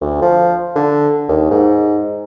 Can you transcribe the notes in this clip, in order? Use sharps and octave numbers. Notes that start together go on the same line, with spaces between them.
D2
F3
D3
D#2
G#2